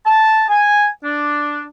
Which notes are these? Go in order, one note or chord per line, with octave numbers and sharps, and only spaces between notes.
A5
G#5
D4